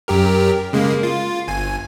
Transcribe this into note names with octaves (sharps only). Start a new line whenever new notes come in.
F#2 G4 A#4
C#3 G#3 A#3
F4
G1 G#5